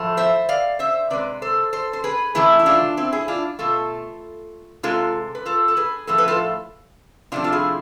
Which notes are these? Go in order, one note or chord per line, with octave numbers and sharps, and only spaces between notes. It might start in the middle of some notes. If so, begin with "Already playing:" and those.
Already playing: A2 F3 A3
C5 E5
D5 F5
C5 E5
C3 G#3 B4 D5
A4 C5
A4 C5
C5
G#4 B4
C3 E3 A3 E4 G#4
E4
D4 F4
C4 E4
E4 G#4
D4 F4
B2 A3 F4 A4
C3 G#3 F4 A4
B4
F4 A4
A4
G#4 B4
A2 F3 A3 A4
B4
F4 A4
C3 F3 A3 D4 F4
F4
E4 G#4